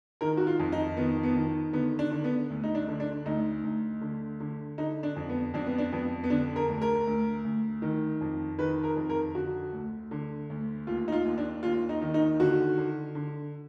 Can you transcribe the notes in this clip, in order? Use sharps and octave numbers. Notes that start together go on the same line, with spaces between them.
D#3 A#4
F#4
F4
F2
D#4
D#3 B3
B3
D#3
D3 B3
D4
D3
B3
D2
D#4
D4
D3
D4
D2 D#4
D2
D3
D3
D3 D#4
D4
F2
B3
F2 D4
B3
D4
F2 B3
B3
D3 D4
A#4
D2
A#4
D2
D2
D#3
F2
D#3 B4
A#4
F2
A#4
D3 F#4
D2
D3
D2
D#2 F4
D#4
F4
D#2
D4
D#2 F4
D#4
D#3
D#4
D3 F#4
D3
D3